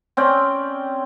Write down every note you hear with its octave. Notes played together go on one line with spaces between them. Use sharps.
C4 C#4 D5 G5